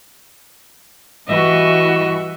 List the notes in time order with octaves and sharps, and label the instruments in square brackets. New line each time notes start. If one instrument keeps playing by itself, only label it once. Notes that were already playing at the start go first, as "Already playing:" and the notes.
[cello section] E3 G3 F#4 [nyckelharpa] D#5 E5